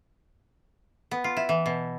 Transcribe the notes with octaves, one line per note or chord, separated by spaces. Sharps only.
B3
F4
E4
E3
B2